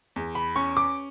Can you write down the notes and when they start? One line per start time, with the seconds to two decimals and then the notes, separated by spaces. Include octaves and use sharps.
0.16 E2
0.35 B5
0.56 C#4 C#6
0.77 D6